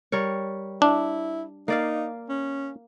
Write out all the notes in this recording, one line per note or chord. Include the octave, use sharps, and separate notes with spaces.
G3 A#4 C#5
D4 E4
A#3 D#4 D5 F5
C#4